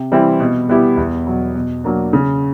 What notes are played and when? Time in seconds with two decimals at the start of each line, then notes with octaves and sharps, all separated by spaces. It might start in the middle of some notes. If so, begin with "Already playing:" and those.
Already playing: C3
0.12 E3 G3 C4 E4
0.40 B2
0.69 G3 B3 E4 G4
0.97 E2
1.27 B2 F#3
1.55 B2
1.84 F#3 A#3 D4
2.13 C#3